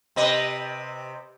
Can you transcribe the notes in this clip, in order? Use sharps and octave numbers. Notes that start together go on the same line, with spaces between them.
C3 B4 D#5